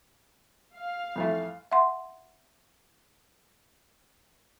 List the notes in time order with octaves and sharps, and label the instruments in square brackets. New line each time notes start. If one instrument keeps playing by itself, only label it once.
[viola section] F5
[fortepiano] F2 E3 A3
[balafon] E5 F#5 C6